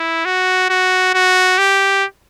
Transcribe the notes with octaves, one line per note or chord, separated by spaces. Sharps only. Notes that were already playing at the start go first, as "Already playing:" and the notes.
Already playing: E4
F#4
F#4
F#4
G4